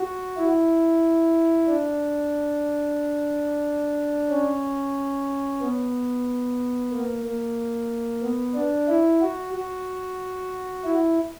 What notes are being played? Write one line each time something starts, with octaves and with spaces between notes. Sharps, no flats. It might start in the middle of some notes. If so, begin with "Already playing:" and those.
Already playing: F#4
E4
D4
C#4
B3
A#3
A#3
B3
D4
E4
F#4
F#4
E4